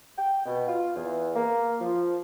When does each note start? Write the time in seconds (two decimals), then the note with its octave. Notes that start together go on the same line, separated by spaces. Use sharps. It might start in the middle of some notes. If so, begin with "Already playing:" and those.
0.18 G5
0.46 B2
0.68 F4
0.96 E2
1.36 A#3
1.81 F3